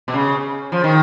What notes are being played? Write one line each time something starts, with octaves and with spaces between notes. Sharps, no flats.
B2
C#3
F3
D#3